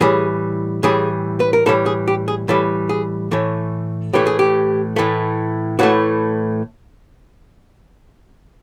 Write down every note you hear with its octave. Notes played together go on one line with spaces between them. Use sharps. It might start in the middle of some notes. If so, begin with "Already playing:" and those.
A2 E3 G3 G#4
A2 E3 G3 G#4
B4
A#4
A2 E3 G3 A4
G#4
G4
G#4
A2 E3 G3 A4
G#4
A2 E3 A3
A2 E3 A3 G4
G#4
G4
A2 E3 A3
A2 E3 A3 F#4